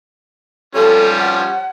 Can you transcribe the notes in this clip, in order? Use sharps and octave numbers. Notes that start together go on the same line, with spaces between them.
F3 G3 C#4 A4
F#5